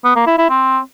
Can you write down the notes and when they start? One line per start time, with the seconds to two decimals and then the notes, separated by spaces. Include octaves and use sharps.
0.04 B3
0.16 A#3
0.27 E4
0.38 E4
0.50 C4